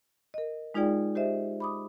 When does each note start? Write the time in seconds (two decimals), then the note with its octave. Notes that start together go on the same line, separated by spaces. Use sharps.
0.34 A#4 D#5
0.74 G#3 D#4 F4 G#4 D5 G5
1.15 G4 C5 D#5 E5
1.60 B5 D6 D#6